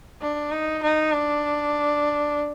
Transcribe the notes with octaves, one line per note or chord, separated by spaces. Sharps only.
D4
D#4
D#4
D4